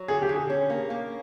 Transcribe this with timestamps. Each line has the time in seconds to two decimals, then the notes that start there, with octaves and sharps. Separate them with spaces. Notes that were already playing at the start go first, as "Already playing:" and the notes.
Already playing: F#3
0.08 D3 G#4
0.22 G4
0.29 D3
0.35 G#4
0.50 C#4
0.70 A#3
0.90 A#3